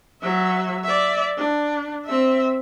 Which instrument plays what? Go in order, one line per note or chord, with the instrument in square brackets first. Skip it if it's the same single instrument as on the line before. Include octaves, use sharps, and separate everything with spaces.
[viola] F#3 E5
D5 E5
D4
C4 E5